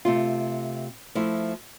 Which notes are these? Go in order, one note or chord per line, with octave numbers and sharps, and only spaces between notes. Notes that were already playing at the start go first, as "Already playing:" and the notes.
C3 A3 F4
F3 A3 E4